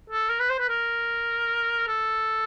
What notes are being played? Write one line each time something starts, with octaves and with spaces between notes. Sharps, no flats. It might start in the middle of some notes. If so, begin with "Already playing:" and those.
A4
A#4
B4
C5
B4
A#4
A4